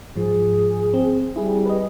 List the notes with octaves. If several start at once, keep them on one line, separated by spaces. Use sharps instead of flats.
G#2 F3 G#4
C4
G3 E4 G#4
B4 D#5